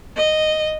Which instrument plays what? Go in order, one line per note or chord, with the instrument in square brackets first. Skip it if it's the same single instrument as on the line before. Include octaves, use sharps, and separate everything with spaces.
[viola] D#5